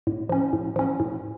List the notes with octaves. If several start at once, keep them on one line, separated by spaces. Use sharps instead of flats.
A2
F3 C#4
A2
F3 C#4
A2